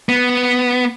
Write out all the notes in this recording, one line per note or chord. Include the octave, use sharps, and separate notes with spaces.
B3